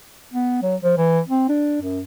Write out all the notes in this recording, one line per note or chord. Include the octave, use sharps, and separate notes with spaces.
B3
F#3
F3
E3
C4
D4
F#2